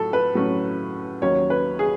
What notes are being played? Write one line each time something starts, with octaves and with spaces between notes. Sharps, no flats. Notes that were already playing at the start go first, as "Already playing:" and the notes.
Already playing: A2 F#3 A4
B4
A2 F#3 A3 C#4
D#2 D#3 F#3 C#4 C#5
B4
G#4